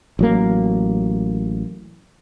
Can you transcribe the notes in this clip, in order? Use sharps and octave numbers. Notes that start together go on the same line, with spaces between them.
A1 F#3 A#3